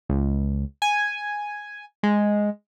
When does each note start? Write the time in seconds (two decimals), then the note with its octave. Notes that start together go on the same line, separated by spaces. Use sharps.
0.09 C#2
0.82 G#5
2.03 G#3